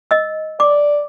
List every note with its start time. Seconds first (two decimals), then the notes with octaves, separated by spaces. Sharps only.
0.11 D#5 E6
0.60 D5 D6